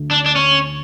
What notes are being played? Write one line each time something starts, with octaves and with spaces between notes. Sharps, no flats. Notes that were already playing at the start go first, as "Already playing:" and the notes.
Already playing: D2 D3 A3
D4
D4
C#4